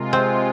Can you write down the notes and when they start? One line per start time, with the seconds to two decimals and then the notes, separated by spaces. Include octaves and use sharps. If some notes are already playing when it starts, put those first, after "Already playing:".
Already playing: C3 G#3 F4 A#4
0.13 C4